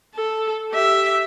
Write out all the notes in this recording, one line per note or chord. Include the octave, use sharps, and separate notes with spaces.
A4
G4 E5